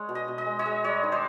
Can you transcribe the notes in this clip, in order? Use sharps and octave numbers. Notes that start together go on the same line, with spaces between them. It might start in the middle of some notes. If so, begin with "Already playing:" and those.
Already playing: G#3 C#5
B2
D#5
B2
D#5
G#3
C#5 D#5
G#3
G3 C#5 D#5
D#3
C5 D5